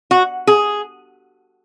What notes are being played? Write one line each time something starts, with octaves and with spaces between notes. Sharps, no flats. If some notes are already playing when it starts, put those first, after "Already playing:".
F#4
G#4